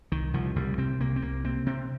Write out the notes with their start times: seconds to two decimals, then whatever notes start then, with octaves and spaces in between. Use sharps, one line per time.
0.12 C2 D#3
0.34 C2 F3
0.56 C2 G3
0.78 C3 C4
1.00 C2 A#3
1.16 C4
1.22 C2 A#3
1.44 C3 C4
1.66 C3 C4